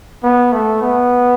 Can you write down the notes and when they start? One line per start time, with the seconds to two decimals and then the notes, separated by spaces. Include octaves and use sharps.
0.23 B3
0.53 A3
0.81 B3